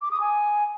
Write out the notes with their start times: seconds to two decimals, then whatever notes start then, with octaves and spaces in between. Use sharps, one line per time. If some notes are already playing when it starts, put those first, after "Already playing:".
0.02 D6
0.11 D#6
0.21 G#5